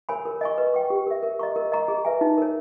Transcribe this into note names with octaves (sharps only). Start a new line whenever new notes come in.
A#4 C#5 G#5 B5
A#4
D#5 G#5 C#6
B4
G5 C#6
G4
A#4 E5
A#4
D#5 A#5 C#6
A#4
D#5 A#5 C#6
G#4
B4 E5 G#5
D#4
A#4 C#5